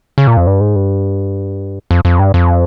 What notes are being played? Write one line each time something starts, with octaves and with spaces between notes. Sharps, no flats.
C#3
A#2
F2
G2
G#2
G2
F2
F2
G2
F2